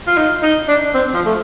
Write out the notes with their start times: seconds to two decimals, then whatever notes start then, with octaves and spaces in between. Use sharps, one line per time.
0.07 F4
0.17 D#4
0.43 D#4
0.68 D4
0.94 C4
1.14 F3
1.26 A3